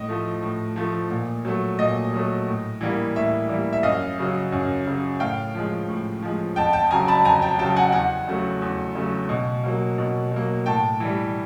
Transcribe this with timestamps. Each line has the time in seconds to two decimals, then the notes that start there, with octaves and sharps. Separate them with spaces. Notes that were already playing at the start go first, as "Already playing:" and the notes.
Already playing: A2 D#5
0.08 F3 A3
0.42 A2
0.76 F3 A3
1.10 A#2
1.45 F#3 A3
1.79 A#2 D#5
2.13 F#3 A3
2.47 A2
2.81 E3 G3 A#3
3.16 A2 E5
3.49 E3 G3 A#3
3.73 E5
3.83 F#2 D#5 F5
4.18 C#3 F#3
4.52 F#2
4.86 C#3 F#3
5.20 A2 F5 G5
5.55 F3 G#3
5.88 A2
6.22 F3 G#3
6.56 F2 G5 A5
6.73 G5 A5
6.91 C#3 F#3 G#5 A#5
7.08 A5 B5
7.25 F2 G#5 A#5
7.42 G5 A5
7.59 C#3 F#3 G5 A5
7.76 F#5 G#5
7.92 E2 F#5 G#5
8.27 C#3 F#3 A3
8.62 E2
8.95 C#3 F#3 A3
9.29 B2
9.64 F#3 A#3
9.98 B2
10.32 F#3 A#3
10.66 A2 G5 A5
11.00 E3 G3